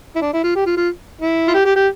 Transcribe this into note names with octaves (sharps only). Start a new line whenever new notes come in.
E4
D4
E4
F4
G4
F4
F4
E4
F4
G4
G4
G4